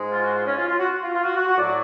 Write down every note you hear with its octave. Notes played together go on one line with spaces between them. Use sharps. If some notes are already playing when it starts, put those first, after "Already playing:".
Already playing: G#2 G#3
F4
F#4
F4
C#4
F4
F4
F#4
F4
F4
F#4
F#4
F#4
A2 F#3 D5